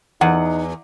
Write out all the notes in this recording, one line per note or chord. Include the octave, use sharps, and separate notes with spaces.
E2 D#4 F#5